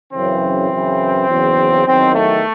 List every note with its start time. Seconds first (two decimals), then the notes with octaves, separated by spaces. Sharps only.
0.13 F#2 C#3 E3 C4
0.70 F#2 C#3 E3
1.28 E2 C#3 F#3
1.86 E2 D#3 F#3 C4
2.15 A3